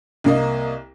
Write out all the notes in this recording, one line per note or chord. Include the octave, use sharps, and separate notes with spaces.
C2 A#3 D#5